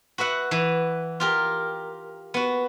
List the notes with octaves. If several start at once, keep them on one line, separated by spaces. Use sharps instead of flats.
F#4 B4 E5 F#5
E3 B4
F4 G4 A#4
B3 F#4